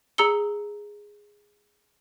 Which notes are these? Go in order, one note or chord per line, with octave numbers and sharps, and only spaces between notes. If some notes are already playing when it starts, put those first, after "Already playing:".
G#4 A#5 E6 C#7 G7